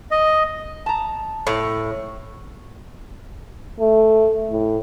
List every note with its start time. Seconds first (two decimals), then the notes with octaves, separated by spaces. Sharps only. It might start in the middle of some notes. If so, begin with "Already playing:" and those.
0.11 D#5
0.86 A5 A#5
1.47 A2
3.80 A3
4.50 A2